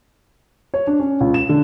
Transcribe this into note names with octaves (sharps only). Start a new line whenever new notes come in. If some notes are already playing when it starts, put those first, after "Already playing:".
C#5
D4
C#4
C#2
E7
D3